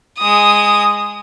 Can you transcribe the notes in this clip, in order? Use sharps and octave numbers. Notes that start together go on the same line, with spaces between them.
G#3 D#6